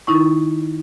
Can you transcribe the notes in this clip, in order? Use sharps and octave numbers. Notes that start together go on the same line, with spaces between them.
D#3 D#4 E4 C#6